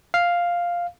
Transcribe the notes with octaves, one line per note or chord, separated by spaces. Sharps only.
F5